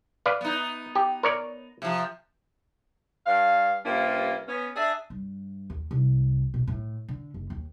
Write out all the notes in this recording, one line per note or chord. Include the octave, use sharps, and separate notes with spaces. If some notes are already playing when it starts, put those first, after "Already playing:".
B4 D5 F5
B3 D#4
G4
A#4 C#5 D5
C3 F3
G2 F5
G2 C3 A#3 C#4 F4
B3 C#4
D4 G#4 E5
G2
D#2
C2
B2
A2
D3
F#1
D#2